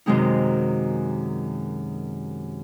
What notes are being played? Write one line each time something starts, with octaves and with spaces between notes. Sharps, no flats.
F#2 C3 D#3 G#3 C4 D#4